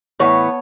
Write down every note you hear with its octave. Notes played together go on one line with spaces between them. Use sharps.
A2 E3 B3 C#5